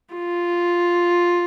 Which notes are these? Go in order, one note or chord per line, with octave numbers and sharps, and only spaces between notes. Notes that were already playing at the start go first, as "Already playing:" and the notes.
F4